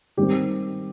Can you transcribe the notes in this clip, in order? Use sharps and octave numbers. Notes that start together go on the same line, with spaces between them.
D#3 G3 C4 G4